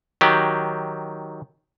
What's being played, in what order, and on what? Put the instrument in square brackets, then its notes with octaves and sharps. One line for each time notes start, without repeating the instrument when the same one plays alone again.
[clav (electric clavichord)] D#3 F#3 G4